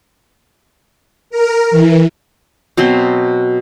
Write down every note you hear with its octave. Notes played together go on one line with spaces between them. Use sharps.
A#4
E3
B2 F#3 C4 C6